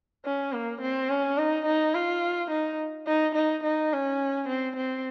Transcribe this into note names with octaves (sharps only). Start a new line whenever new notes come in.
C#4
A#3
C4
C#4
D#4
D#4
F4
D#4
D#4
D#4
D#4
C#4
C4
C4